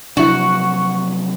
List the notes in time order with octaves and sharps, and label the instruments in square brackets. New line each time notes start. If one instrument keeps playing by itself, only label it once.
[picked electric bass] C3 F3 F#3 [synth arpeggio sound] D4 E4 [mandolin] F#4